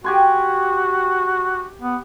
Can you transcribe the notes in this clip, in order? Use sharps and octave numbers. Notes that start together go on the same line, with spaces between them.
F#4 G4 G#5 C6
B3